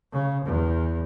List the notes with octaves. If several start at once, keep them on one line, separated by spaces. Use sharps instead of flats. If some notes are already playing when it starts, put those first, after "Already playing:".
C#3
E2